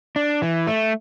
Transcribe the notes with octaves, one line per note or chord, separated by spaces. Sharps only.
D4
E3
A3